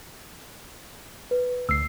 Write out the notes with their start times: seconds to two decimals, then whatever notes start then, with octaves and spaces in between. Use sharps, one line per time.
1.31 B4
1.69 D2 E6 C7